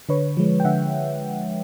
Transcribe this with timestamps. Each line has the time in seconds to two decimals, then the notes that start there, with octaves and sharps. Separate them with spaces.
0.09 D3 B4 C#5
0.37 F3 G#3
0.60 G5
0.64 D3 E5 F#5